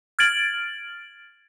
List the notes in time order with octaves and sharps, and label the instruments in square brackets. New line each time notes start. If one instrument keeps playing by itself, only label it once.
[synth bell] F6 G#6 A6 D7 F#7